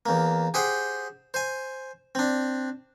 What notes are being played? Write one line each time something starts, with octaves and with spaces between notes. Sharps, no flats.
E2 A#3
G4 G#4 C5 F#5 G5
C5 G#5
C4 D4